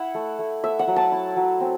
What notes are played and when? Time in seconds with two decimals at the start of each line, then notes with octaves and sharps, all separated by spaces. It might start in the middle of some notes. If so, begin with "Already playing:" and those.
Already playing: E4 E5 F#5
0.15 A3
0.39 A3
0.64 A3 E5
0.79 F#5
0.88 F#3
0.96 A5
1.12 E4
1.37 F#3
1.60 C4